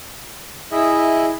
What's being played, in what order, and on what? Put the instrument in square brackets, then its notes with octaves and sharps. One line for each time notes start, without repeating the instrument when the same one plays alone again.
[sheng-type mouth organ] E4 G#4 D#5 E5